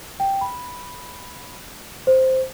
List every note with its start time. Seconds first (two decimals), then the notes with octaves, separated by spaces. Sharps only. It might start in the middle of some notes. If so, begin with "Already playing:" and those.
0.20 G5
0.41 B5
2.07 C5